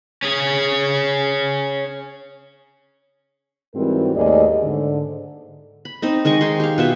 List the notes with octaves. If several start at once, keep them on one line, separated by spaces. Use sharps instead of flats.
C#4 G#4
G#2 E3 G3 C4 F#4 A#4
D#2 G#2 A3 G#4 D5 D#5
G#2 D3
B5
C4 D#4 D#5
D#3 G#3 D#5 C#6
D#4 G#4 C6
G4 F5
B2 F4 E5